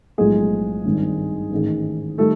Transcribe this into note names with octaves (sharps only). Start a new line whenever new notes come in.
B1 A2 F3 G#3 A3 G#4
G#1 G2 D#3
A1 G#2 D#3 G#3
D#3 G3 A3 A4